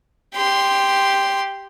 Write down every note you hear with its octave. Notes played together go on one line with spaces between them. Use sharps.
G4 C6